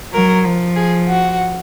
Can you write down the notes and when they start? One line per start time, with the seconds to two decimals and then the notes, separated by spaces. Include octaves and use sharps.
0.13 F#3 A#4
0.45 F3
0.76 G#4
1.08 F#4